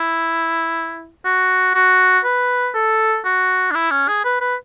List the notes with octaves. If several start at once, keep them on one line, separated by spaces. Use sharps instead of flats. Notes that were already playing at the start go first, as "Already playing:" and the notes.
Already playing: E4
F#4
F#4
B4
A4
F#4
D4
E4
C#4
G#4
B4
B4